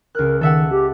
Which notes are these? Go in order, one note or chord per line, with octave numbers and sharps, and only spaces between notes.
C#2 A#4 F#6
D#3 A4 E5 F#5
G4